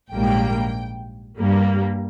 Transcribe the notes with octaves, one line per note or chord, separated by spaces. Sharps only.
A#1 G#2 G3 A#3 G5
G2 G3 A#3